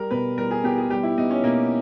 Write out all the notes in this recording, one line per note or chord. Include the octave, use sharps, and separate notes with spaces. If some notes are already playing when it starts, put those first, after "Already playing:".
Already playing: G3 A#4
B2 B4
G3 A#4
G#4
B3 G4
G#4
G3 G4
E4
B3 D#4
C#4
B2 A#3